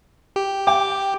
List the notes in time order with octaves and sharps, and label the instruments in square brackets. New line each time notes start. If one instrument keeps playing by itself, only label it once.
[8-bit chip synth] G4
[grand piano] G5 [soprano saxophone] D6